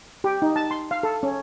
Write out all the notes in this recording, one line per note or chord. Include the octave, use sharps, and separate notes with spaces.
G4
D#4
A5
C6
F5
A4
C#4